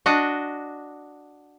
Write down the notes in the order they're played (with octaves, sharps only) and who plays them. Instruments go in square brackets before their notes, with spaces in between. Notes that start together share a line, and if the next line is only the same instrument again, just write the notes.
[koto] D4 F#4 D#5